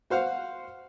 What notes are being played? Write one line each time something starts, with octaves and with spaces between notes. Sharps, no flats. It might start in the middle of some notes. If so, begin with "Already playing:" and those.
F#4 C5 F5 F#5